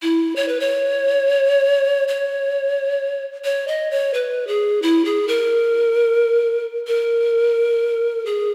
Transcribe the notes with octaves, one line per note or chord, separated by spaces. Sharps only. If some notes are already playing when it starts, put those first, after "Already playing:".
E4
C#5
B4
C#5
C#5
C#5
D#5
C#5
B4
G#4
E4
G#4
A#4
A#4
G#4